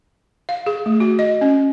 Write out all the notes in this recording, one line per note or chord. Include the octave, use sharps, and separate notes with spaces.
F5
G#4
A3
F#4
D#5
C#4